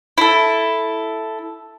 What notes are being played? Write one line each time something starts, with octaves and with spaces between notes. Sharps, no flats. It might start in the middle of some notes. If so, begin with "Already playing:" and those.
E4 A4